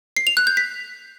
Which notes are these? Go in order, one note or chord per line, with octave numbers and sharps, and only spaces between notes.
C7
F7
F#6
G6
B6